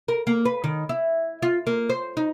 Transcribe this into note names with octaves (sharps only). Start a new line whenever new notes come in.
A#4
A#3
B4
D#3
E4
F4
A#3
C5
D#4